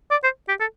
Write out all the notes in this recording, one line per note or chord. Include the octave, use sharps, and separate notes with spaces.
D5
C5
G4
A4